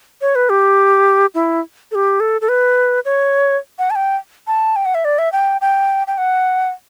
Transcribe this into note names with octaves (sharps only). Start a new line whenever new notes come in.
C#5
B4
G4
E4
A4
G4
A4
A4
B4
C#5
F#5
A5
G5
A5
G5
F#5
E5
D5
E5
G5
G5
G5
F#5